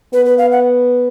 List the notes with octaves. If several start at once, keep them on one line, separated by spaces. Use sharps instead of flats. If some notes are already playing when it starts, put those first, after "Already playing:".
B3 B4
B4
F5
F#5